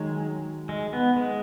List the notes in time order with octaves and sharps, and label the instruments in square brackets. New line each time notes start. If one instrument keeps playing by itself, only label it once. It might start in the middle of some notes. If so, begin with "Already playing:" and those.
Already playing: [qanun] D#3 F#3 [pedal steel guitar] G#3
[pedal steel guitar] G#3
B3
G#3